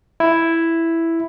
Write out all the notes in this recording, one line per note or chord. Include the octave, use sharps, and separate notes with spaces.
E4